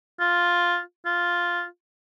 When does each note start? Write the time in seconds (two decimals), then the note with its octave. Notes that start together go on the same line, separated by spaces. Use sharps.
0.20 F4
1.06 F4